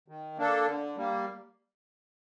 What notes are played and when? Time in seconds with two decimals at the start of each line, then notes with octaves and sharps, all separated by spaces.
0.08 D#3
0.37 A#3 D4 A4
0.67 D3
0.96 G3 A#3